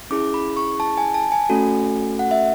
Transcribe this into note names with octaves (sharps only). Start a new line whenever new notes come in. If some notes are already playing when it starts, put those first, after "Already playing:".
C#4 E4 G#4 D6
B5
C#6
A5
G#5
A5
G#5
A3 C#4 F#4 A4
F#5
E5